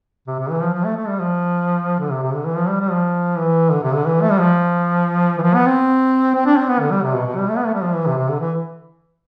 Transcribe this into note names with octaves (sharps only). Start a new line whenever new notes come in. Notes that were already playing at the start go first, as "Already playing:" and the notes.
C3
C3
E3
F3
F3
A3
A3
G3
F3
D3
C3
C3
D3
E3
F3
G3
G3
F3
E3
D3
C3
D3
E3
A3
G3
F3
E3
F3
B3
C4
C4
D4
C4
B3
D3
G3
C3
B2
B2
G3
A3
B3
A3
G3
F3
E3
C3
C3
D3
E3